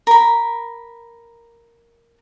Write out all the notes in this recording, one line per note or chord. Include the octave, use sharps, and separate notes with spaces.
A#4 B5